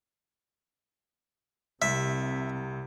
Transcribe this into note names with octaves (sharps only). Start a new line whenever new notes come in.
C2 C3 E5